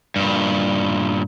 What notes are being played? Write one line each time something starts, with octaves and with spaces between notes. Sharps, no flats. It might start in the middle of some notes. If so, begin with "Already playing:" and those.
G2 A#2